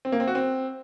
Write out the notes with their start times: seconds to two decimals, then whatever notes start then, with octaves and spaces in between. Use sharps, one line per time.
0.05 C4
0.12 A#3
0.20 C4
0.27 F#4
0.35 C4